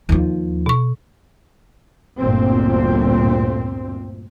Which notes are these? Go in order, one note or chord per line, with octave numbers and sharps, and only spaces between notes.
D#2 F3
B2 C#6
G1 D2 A#2 C4